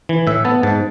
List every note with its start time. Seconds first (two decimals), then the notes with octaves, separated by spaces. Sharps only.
0.09 E3
0.27 A2 E5
0.45 B3 A5
0.63 G#2 A5